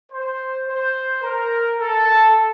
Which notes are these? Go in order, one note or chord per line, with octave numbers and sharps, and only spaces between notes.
C5
C5
A#4
A4